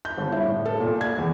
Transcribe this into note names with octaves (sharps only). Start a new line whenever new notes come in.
G6
G1
E4
A2
A4
A#2
G#6
E2